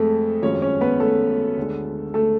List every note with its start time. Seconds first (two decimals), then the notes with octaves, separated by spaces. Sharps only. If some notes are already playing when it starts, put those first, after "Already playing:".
Already playing: F2 G#3 A3 A4
0.42 G#1 F#2 F3 G#3 C#4 C#5
0.62 C#4 C#5
0.81 B3 B4
1.00 A3 A4
1.57 D2 D3 G#3
2.14 A3 A4